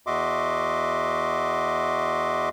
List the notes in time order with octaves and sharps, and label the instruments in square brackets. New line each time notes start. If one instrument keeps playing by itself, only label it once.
[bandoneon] E2 F#4 D#5 E5 C6 D6